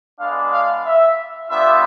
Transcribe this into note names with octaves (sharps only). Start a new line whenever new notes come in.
G#3 B3 D4 F5
F5
E5
G3 B3 D4 F4 E5